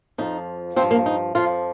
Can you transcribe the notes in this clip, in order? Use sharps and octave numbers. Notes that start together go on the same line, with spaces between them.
F2 F3 D#4
G2 F3 C4
A#3
D#4
F2 F3 F4